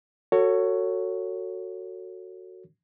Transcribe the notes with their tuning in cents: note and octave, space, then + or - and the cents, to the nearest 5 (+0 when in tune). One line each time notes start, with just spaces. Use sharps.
F#4 +0 A4 +30 C#5 +0